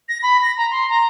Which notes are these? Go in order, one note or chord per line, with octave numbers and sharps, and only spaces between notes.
A#6
B5
A#6
A#5
C6
A#5